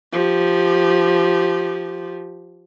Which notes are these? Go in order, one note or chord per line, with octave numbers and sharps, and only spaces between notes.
F3 G4